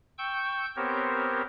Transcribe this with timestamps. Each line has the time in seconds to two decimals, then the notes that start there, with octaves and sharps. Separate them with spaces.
0.18 G5 C#6 E6 G6
0.76 B3 C4 G4 A#4 C5 C#5